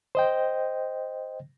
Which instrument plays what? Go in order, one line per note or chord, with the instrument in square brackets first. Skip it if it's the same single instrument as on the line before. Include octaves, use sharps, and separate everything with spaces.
[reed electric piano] C5 D#5 G5